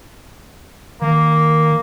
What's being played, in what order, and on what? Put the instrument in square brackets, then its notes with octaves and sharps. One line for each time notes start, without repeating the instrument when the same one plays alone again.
[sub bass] D#3 [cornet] A#3